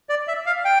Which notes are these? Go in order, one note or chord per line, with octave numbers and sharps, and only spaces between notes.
D5
E5
F5
G5